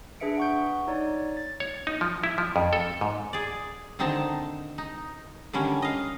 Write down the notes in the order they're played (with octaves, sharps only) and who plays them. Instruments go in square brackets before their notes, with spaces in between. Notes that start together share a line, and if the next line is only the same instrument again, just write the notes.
[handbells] D4 G#4 B4 E5 C#7 D7
F#5 C#6 G6
D#4 C#5 D5
A6
[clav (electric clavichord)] C#5
D#4
F3
E4
F3
F2
A4
G#2
[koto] G#4 D5
D3 D#3 C4 D#4 A5
D#4
D3 D#3 G3 C#4
D#5 F5